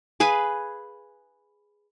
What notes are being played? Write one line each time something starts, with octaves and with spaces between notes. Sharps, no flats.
G#4 B4 F5 G#5